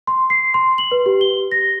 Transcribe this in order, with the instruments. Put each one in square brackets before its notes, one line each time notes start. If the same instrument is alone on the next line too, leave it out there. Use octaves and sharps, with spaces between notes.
[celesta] C6
C7
C6
F#7
B4
G4
G7
A#6